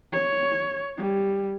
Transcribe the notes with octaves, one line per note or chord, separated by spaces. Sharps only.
C#5
G3